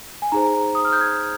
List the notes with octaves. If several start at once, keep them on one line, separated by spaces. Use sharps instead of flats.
G#5
D#4 G#4 C5 A#5
D#6
F6
G6
G#6